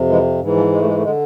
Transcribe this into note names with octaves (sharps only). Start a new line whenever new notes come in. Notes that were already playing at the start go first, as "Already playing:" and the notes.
Already playing: F2 C3
E3 G#3
G#2 E3
F3
G#3
A3
G#3
A3
D3 G#3